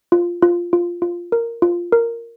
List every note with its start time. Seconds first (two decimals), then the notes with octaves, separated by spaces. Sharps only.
0.12 F4
0.42 F4
0.73 F4
1.02 F4
1.32 A#4
1.62 F4
1.92 A#4